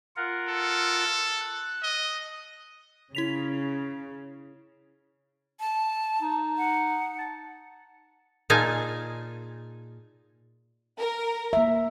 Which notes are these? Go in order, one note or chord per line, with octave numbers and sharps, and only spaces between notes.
F4 A#4 F#5
A4
F#6
D#5
C#3 E4 B6 F7
A5
D#4
F#5
A5
A#2 D#4 F4 G#4 G#5 A5
A#4
A#3 E5